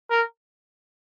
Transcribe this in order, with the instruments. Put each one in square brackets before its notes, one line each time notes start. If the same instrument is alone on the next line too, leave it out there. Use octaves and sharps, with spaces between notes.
[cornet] A#4